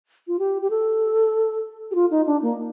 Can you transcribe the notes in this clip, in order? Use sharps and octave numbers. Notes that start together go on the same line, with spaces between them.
F4
G4
G4
A4
G4
F4
D#4
D4
A#3